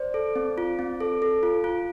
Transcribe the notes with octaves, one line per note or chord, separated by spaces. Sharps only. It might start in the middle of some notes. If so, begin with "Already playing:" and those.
Already playing: C5 D5
A4
C4
F4
C4
A4
A4
F4
F4